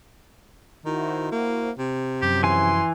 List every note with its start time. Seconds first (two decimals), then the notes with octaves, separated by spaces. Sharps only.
0.85 D#3 E4 F#4 C5
1.32 A#3
1.78 C3
2.22 F#2 F3 F#3 G4
2.43 E3 G#5 C6